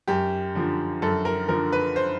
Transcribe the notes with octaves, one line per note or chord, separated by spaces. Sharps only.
F#2 G4
D3 F3
F#2 A4
A#4
D3 F3 A#4
B4
C5